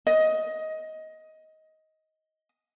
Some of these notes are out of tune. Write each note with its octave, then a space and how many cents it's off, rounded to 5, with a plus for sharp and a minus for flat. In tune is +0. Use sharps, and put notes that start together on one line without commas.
D#5 +15